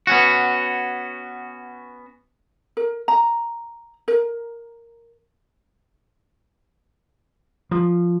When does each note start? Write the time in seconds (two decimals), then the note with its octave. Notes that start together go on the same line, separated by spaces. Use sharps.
0.07 B3 C#4 F#4
2.77 A#4
3.08 A#5
4.08 A#4
7.71 F3